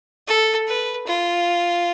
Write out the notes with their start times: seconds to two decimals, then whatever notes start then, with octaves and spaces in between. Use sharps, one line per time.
0.27 A4
0.67 B4
1.07 F4